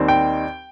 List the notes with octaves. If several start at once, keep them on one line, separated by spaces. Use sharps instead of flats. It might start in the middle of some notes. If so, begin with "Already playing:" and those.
Already playing: D#2 D#3 G3 C4 D#4
G5